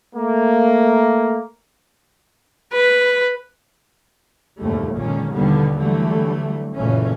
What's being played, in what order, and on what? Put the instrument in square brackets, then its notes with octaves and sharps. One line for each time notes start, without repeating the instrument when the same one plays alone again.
[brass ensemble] A3 A#3
[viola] B4
[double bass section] F1 D#2 G#2 D3 G3 A3
C#2 A#2 D3 D#3 C#4
D#2 B2 D3 D#3 G3 B3
D3 E3 F#3 G3 A3
F#1 A#2 E3 A3 C#4